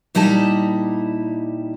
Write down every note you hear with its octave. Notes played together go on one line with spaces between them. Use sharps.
A#2 G3 D#4 E4 A5